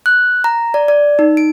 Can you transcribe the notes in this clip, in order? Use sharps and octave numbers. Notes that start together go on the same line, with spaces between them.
F#6
A#5
D5
D5
D#4
D7